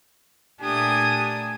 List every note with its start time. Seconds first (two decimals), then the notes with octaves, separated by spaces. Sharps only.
0.61 A#2 A3 D4 G4 G#5 D#6